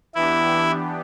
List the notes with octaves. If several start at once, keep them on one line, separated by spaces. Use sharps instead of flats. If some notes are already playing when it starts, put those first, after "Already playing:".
E3 B3 D4 E4 G4